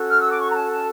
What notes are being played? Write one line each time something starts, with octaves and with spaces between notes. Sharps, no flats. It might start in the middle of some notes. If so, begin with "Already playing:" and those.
Already playing: C#4 F#4 A4
F6
E6
D6
C#6
A#5
A5
A5